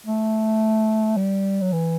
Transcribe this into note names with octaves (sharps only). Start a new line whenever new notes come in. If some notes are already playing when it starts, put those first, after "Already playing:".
A3
G3
F#3
E3